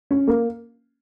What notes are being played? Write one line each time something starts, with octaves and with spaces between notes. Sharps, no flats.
C#4
A#3